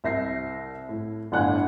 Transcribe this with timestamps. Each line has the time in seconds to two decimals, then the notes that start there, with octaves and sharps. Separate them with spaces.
0.04 C2 E5 A#6 C7
0.89 A2
1.32 G1 A2 D4 F#5 G#5 F#6